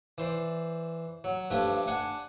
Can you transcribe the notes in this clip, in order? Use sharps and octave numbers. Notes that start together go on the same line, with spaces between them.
E3 C5 D5
F#3
G2 F3 A3 D4 G4
D4 F#5 G#5